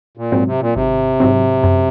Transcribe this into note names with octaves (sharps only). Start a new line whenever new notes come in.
A#2
G#2 F#3 C4
C3
A#2
G#1 C3
G#2 F#3 C4
F#2